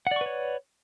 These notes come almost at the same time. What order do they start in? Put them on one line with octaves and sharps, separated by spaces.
F#5 D5 C#6 B4 C#5